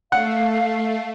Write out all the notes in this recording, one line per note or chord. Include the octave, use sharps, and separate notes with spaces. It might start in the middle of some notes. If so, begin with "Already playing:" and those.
A3 F5 F#5